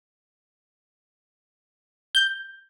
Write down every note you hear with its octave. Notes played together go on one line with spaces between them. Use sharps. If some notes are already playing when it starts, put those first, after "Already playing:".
G6